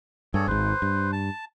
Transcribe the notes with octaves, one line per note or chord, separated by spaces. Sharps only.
G2 G#4 A4 C#5
G#1 G#2 B4 C5
G2
A5